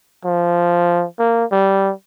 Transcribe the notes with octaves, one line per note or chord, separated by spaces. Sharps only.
F3
A#3
G3